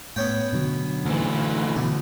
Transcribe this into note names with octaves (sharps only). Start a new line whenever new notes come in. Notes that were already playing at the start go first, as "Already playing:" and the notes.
A2 B3 C#4 G5
B2 D3 F#3
D2 E3
D2 B2